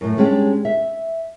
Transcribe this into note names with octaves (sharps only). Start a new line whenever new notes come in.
F#2 A2
G3 G#3 C#4 D4 G4
E5